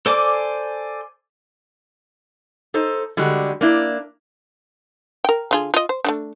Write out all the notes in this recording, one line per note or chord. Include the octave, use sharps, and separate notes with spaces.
A4 C5 D5 G#5 D6
D#4 A4 C5
D3 G3 G#3 F#4
A#3 D4 E4
A#4 G5
D3 F4 G#4
F4 D#5
C5
A3 A#3 D4